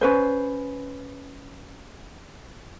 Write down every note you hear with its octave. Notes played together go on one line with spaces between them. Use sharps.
C#4 B4 C5